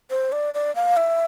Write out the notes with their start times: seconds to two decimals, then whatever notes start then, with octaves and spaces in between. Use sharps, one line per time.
0.10 C5
0.32 D5
0.54 D5
0.75 F5
0.97 E5